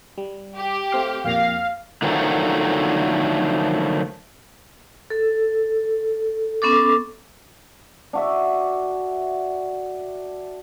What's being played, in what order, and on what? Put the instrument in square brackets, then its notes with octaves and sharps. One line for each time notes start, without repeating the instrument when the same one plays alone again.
[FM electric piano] G3
[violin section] G4
[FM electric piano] A3 C4 F5
[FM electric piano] F2 A#2 A#6 [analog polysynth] F5
[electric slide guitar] D3 D#3 F3 F#3 A3
[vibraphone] A4
B3 C#4 A4 D6
[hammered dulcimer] D4 F#4 E5